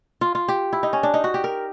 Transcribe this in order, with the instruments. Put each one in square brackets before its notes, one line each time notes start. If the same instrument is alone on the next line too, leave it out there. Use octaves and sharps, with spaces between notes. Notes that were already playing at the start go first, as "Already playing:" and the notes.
[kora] F4
F4
G4
E4
D#4
C#4
D4
D#4
F#4
G4
A#4